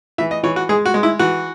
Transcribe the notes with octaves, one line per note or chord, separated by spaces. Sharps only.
E3 E5
D#5
E3 C#5
F#4
G#3 G#4
F#4
G#3
E4
E3 F#4